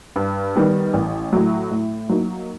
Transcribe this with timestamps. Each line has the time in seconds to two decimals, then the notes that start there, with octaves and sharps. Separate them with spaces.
0.16 G2
0.55 D#3 G3 B3
0.94 A1
1.33 A2 F#3
1.71 A2
2.09 F#3 A#3 D#4